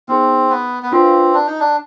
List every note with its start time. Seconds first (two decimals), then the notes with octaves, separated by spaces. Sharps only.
0.08 B3 C4 D#4 G#4
0.50 B3
0.83 B3
0.92 C4 D4 F4 B4 F5
1.34 D4
1.47 D#4
1.60 D4